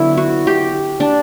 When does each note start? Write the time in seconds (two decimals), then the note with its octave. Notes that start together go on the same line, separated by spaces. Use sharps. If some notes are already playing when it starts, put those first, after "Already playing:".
Already playing: D3 F#3 B3 E4
0.17 F#4
0.47 G4
1.00 D4